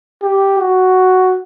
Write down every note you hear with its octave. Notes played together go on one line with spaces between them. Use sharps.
G4
F#4